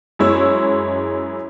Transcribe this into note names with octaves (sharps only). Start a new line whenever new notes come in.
F#2 G#3 E4 C#5 E6